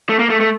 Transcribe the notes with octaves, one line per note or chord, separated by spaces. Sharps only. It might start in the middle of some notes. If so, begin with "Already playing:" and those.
A3
A#3
A3
A3